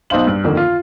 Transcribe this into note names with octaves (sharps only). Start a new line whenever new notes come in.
B1 D#4 C5 F5 F#7
G2
F2 D3 D#3 A#3
F4